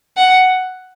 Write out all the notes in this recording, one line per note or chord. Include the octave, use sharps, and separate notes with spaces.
F#5